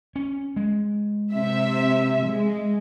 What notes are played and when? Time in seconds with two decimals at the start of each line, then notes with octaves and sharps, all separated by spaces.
0.16 C#4
0.56 G#3
1.34 C3 E5
2.26 G#3